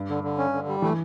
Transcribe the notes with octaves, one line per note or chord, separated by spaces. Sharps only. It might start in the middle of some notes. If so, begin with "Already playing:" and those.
Already playing: G2
D3
D3
C#4
D3
G3
E3 A3